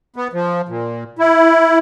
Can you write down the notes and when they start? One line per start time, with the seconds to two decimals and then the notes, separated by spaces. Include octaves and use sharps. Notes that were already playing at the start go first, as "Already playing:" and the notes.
0.16 B3
0.33 F3
0.69 A#2
1.19 E4